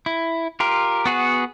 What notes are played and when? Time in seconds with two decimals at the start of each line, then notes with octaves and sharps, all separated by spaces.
0.06 E4
0.60 F4 G4 A#4
1.05 B3 F#4 G#4 F#5